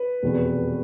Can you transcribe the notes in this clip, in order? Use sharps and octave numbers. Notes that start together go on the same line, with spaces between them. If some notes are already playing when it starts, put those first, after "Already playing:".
Already playing: B4
F1 E2 B2